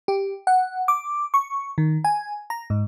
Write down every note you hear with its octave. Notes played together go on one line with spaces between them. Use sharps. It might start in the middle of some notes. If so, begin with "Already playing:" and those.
G4
F#5
D6
C#6
D#3
G#5
A#5
G#2